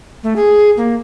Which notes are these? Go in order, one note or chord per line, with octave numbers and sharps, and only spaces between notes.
A3
G#4
A#3